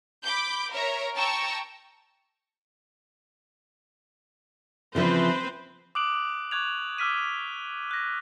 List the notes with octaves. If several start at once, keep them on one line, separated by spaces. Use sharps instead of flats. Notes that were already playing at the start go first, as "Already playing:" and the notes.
B5 D6 G6
A#4 C#5 E5 A#5
G5 A5 A#5 C#6 E6
C#3 E3 F3 C4 B4 C5
D6 D#6 F#6 D7 F#7
C#6 D6 F#6 G#6 F7
D6 E6 F6 B6 D#7
F#6 A#6